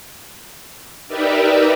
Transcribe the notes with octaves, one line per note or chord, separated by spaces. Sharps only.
D#4 G4 A#4 B4 D5 E5